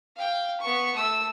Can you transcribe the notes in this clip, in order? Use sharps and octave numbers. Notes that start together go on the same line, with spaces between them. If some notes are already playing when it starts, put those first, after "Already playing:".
F5 G5
B3 C#6
A3 E6